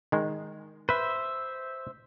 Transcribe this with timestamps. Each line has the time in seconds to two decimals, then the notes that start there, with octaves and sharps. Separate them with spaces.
0.12 D#3 G#3
0.89 B4 C5 E5